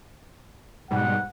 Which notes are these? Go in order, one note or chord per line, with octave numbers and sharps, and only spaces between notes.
G#2 B2 G3 F#5